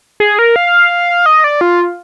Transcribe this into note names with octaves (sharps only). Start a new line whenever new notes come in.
G#4
A#4
F5
D#5
D5
F4